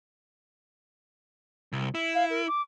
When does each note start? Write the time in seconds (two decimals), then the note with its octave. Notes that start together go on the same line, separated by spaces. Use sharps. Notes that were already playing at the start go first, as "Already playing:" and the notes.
1.73 C2
1.95 E4
2.15 F5
2.30 A#4
2.48 D6